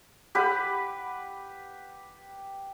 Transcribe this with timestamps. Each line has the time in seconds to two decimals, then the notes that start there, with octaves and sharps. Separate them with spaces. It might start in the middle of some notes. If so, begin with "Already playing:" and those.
0.35 G4 B4 F#5